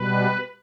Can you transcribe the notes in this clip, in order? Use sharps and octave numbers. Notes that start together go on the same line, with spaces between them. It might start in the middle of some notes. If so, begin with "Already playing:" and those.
Already playing: B2 G3 B4